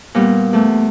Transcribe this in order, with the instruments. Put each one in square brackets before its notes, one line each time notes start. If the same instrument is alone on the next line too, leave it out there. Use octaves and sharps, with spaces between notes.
[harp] A#2 G3 B3
E2 A3